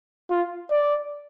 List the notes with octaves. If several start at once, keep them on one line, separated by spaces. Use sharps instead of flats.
F4
D5